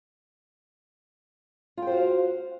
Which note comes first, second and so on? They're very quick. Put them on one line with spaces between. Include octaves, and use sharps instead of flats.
F4 G5 C5 F#4 F5